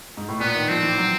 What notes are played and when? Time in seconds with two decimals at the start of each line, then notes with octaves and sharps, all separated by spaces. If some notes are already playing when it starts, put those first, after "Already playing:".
0.17 G#2
0.28 A2
0.40 A#2 B3
0.55 D#3
0.68 F3 C4
0.83 E3
0.97 F#3